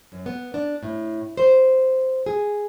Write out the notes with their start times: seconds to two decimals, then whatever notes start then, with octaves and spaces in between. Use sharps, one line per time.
0.12 F#2
0.26 B3
0.54 D4
0.83 A2
1.37 C5
2.26 G#4